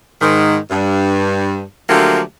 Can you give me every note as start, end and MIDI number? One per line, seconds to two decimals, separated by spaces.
0.21 0.57 44
0.21 0.57 51
0.70 1.60 43
1.89 2.21 50
1.89 2.21 53
1.89 2.21 54
1.89 2.21 57
1.89 2.21 58
1.89 2.21 67